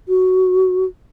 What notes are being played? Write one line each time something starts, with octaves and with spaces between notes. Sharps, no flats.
F#4